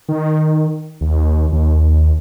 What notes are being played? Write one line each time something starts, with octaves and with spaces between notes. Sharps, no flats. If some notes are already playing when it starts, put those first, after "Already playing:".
D#3
D#2
D#2